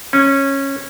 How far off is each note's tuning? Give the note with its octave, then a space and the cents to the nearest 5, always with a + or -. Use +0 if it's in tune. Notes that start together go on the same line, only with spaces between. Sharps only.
C#4 -15